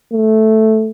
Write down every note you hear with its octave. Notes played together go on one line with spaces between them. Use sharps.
A3